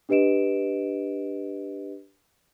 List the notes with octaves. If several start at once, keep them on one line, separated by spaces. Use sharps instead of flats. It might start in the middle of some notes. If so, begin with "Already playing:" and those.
D4 G4 B4 D#5 D7 E7